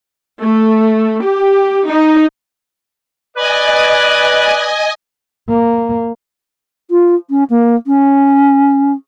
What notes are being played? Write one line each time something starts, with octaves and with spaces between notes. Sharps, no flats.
A3
G4
D#4
B4 D5 D#5 G#5
A#3
F4
C#4
A#3
C#4